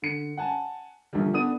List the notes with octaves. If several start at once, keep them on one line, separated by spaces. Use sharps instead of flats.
D3 C#7
F#5 G#5 A5
A#1 D3 F3 G3
A3 B3 D4 D#6 D#7